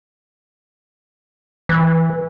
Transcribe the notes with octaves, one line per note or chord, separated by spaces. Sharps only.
E3